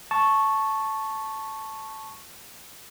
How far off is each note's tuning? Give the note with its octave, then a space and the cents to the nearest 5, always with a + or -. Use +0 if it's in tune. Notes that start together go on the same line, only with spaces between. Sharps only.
A5 -5 C#6 -5